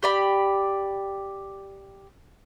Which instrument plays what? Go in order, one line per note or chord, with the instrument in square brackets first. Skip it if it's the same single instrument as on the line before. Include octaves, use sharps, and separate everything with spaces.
[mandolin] G4 D5 B5